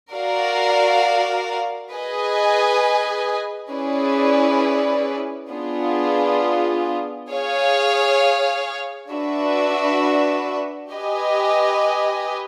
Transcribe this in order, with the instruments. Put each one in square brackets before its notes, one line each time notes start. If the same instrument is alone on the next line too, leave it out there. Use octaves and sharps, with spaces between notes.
[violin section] F#4 A#4 D5 F5
G#4 B4 D#5 G#5
C#4 E4 G#4 B4 D5
B3 D4 F4 G#4
G#4 C#5 F5
D4 F#4 B4 E5
G4 B4 D#5 G#5